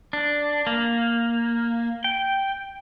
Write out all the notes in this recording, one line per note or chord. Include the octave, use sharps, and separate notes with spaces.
D4
A#3
G5